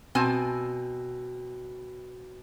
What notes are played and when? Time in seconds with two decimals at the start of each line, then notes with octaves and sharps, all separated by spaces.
0.15 B2 C4 G#5 A5